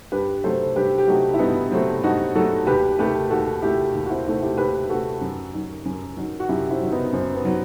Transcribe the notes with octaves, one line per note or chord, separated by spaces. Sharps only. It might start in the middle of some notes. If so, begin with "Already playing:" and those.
G2 G4 B4
F#3 A3 A4 C5
G2 G4 B4
G4
F#3 A3 D#4 F#4
E4
G2 B3 D#4
F#3 A3 C4
G2 D#4 F#4
F#3 A3 F#4 A4
D#2 G4 B4
D#3 A3 G4 B4
D#2 F#4 A4
D#3 A3 E4 G4
D#2
F#4
C4 E4
D#3 A3 C4 E4
E4 G4
D#2 G4 B4
D#3 A3 F#4 A4
F#2
D#3 F#3
F#2
D#3 F#3
F#4
F#2 E4 G4
C4 E4
D#3 F#3
B3 D#4
F#2 C4
B3
D#3 F#3